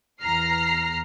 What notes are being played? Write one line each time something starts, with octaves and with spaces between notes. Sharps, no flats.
E2 A#5 F6 C7